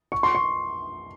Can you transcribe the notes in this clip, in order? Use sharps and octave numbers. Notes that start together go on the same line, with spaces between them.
C#6
C6
C#6